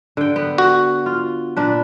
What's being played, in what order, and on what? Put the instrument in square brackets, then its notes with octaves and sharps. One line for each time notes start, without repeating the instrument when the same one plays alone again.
[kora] D3 G5
B3
[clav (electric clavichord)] F#4
[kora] F4
A#2 D4 B4